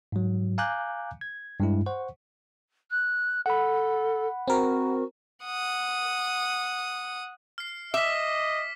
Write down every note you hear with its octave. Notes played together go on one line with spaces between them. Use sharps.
G#2 F#3
F5 G#5 A#5 D6 F#6 G6
G#6
G2 G#3 E4
C5 F#5 C#6
F#6
A4 F#5 B5
C4 F#4 A#4
F#5 D#6
F6 C7
D#5 E5 D6 B6